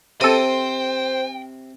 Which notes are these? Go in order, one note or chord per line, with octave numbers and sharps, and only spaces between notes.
C3 A4 C5 G5 D#7